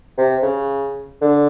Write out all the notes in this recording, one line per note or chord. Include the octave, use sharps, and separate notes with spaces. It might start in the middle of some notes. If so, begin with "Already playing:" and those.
C3
C#3
D3